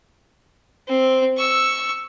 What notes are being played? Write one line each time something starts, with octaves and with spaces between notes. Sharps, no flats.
C4
C#6 E6